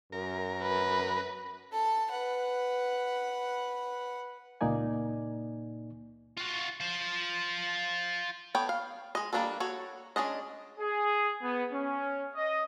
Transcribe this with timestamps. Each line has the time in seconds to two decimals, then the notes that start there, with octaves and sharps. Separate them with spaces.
0.12 F#2 A#4
0.62 B4
1.72 A4 A5
2.11 B4 F#5
4.61 C#2 A#2 A#3 D#4 D5 G#5
6.37 F4 F#4
6.80 F4 C5
8.55 B3 A4 C#5 G5
8.69 F5
9.15 G#3 D#5
9.33 G3 A#3 D4 D#4 A4
9.60 F#4 A4 C#5
10.16 G#3 C#4 D4 D#5
10.79 G#4
11.42 B3
11.72 C#4
12.34 D#5